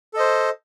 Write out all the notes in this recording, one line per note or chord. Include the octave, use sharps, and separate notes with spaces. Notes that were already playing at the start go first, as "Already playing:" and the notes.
A4 C5 D#5